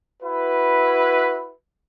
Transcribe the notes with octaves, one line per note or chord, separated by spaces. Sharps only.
E4 F#4 B4